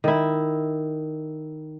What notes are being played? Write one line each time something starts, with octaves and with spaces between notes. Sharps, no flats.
D#3 E4